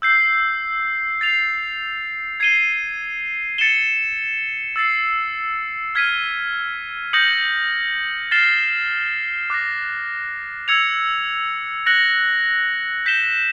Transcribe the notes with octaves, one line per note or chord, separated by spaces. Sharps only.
E6 G6 C7
A6 C7 F7
G#6 C7 D#7 G7
A6 C#7 E7 G7
E6 A6 C7
F6 G#6 B6 D#7
D#6 G6 A#6 C#7 F#7
F6 A6 C7 E7 G7
D6 F#6 A#6
E6 G#6 C#7 F7
F#6 A#6 C#7 F#7
G6 B6 E7 G7